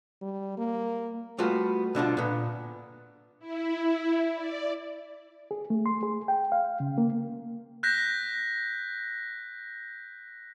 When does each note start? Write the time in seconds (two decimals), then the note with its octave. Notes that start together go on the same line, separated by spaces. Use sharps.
0.22 G3
0.57 A#3
1.38 G3 A3 B3 F4 F#4
1.95 B2 D3 D4 F4
2.17 A#2 B3
3.39 E4
4.34 D5
5.51 G#4
5.70 A3
5.86 C6
6.03 G#4
6.28 G5
6.52 F5
6.80 C#3
6.98 A#3
7.83 F#6 G6 A#6 B6